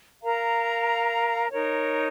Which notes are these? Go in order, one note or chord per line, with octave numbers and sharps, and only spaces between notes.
A#4 F5 A#5
D#4 A#4 C#5